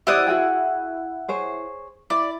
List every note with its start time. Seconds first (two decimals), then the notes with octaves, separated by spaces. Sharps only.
0.07 E4 G4 C5 D5 F#5 D#6
0.27 F#4 G#4 G5
1.28 G#4 C5 C#5
2.10 E4 D5